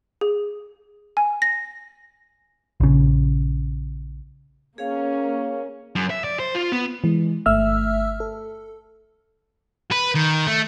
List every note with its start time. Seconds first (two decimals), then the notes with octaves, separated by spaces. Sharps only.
0.21 G#4
1.17 G#5
1.42 A#6
2.80 A#1 C#3
4.78 A#3 C#4 G#4 C#5 F5
5.96 F#2
6.10 E5
6.24 D5
6.39 C5
6.55 F4
6.72 B3
7.04 E3 G#3
7.46 G1 A3 E5 E6 F6
8.20 A4
9.91 B4
10.15 D#3
10.47 A3